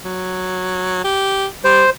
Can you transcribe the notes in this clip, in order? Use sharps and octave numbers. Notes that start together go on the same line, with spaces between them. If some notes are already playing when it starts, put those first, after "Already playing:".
F#3
G4
G3 C5